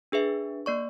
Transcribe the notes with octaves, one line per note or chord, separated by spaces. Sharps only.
D4 G#4 B4 E5
A#3 D5 C#6